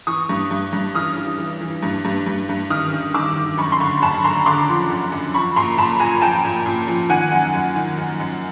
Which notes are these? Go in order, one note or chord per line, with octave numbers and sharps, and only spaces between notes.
E3 C#6 D#6
G2
G2
G2
E3 D#6 F6
E3
E3
E3
G2
G2
G2
G2
D#3 D#6 F6
D#3
D#3 D6 E6
D#3
F#2 B5 C#6
C6
D3 B5 C#6
F#2 A5 B5
C#6
D3 A#5 C6
D3 C6 D6
F3
F#2
F#2
F3 B5 C#6
A#2 A#5 C6
A#2 A5 B5
A#2 G#5 A#5
F3 G5 A5
A#2
A#2
F3
D#3 F#5 G#5
F#2
F#2
D#3
F#2
F#2